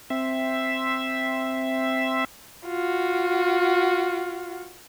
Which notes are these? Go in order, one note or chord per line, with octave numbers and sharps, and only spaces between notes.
C4 E5
F4 F#4